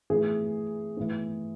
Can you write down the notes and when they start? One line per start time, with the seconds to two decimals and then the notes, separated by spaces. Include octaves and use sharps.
0.10 A2 E3 G#4
0.97 A2 E3